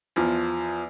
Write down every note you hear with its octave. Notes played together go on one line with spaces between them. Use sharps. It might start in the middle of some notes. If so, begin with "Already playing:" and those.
E2 F3